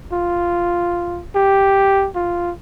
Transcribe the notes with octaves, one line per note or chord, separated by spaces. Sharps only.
F4
G4
F4